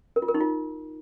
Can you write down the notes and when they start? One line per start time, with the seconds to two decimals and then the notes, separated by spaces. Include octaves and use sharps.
0.16 A#4
0.22 F4
0.28 A#4
0.34 D#4
0.41 F4